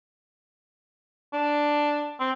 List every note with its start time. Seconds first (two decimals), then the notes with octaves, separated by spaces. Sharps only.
1.33 D4
2.20 C4